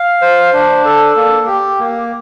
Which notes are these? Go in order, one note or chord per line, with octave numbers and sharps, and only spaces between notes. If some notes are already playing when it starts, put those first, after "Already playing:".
Already playing: F5
C5
D4
A4
A#3
G4
A#3